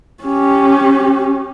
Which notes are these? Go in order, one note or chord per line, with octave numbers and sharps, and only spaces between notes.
C#4 G4